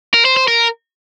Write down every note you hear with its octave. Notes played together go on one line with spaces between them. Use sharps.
A#4
C5
C5
A#4